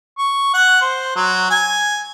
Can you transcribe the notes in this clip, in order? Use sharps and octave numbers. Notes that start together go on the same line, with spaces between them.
C#6
F#5
C5
F#3
G#5